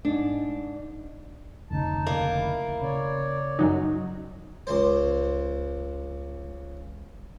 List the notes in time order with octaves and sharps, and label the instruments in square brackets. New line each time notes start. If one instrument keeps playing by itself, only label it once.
[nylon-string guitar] G#2 D4
[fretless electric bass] F1 D2 C#3 [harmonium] D#4 A5
[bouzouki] A#3
[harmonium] E4
[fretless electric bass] C#3 [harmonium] C#5 D5
[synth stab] F#2 F#3 D#4
[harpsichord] C#2 C5